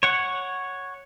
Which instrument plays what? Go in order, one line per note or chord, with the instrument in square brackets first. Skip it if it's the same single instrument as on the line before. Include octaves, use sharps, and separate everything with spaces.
[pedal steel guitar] C#5 F#5